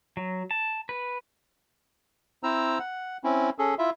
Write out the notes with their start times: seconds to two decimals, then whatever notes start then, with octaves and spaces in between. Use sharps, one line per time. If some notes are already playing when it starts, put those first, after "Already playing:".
0.17 F#3
0.51 A5
0.89 B4
2.43 C4 E4 C5 A#5 E6
2.79 F#5
3.24 C4 C#4 E4
3.59 C#4 G#4 A4
3.79 E4 F4 E5